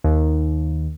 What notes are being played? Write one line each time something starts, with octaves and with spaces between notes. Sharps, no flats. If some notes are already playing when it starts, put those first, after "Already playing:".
D#2